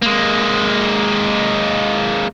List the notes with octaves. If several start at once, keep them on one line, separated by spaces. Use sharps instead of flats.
G#3 A#3